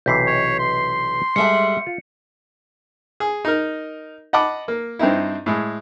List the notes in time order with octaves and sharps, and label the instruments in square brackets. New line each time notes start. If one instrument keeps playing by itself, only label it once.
[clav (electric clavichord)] B1 C3 E3 [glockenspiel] G6 B6 C7
[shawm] C#5
C6
[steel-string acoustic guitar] G3 E5 F#5 [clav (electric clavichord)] G#3 A4 [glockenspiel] C#7
[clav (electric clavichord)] F4
[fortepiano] G#4
D#4 A#4
D#5 F#5 A5 B5 D6
A#3
G2 C4 D#4 E4
A2 G#3